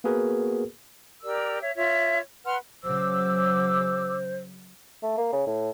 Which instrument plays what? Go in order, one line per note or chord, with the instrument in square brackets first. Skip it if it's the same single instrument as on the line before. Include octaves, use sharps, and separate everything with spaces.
[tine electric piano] A#3 B3 F#4 G#4 A#4 B4
[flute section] G4 A#4 D5 E6
C#5 E5
F4 C#5 E5
B4 F#5 C6 F6
[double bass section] C#3 F#3 [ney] C5 [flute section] D6 E6
[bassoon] A3
A#3
C#3
A2